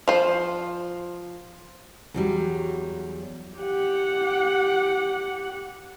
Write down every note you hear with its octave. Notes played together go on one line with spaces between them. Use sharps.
F3 C5
E2 F#3 G3
G4 F#5